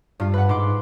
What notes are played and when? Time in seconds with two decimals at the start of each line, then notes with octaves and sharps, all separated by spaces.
0.20 G2 F4
0.34 B4 F#5
0.49 G#2 C6 D6